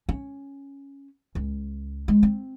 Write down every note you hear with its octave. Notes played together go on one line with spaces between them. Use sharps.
C#4
C#2
G#3
C4